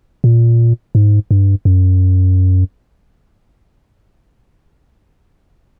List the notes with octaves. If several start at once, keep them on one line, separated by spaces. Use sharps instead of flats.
A#2
G#2
G2
F#2